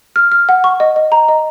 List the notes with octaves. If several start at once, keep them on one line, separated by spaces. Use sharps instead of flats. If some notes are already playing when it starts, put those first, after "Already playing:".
F6
F6
F#5
C#6
D#5
D#5
A#5
D#5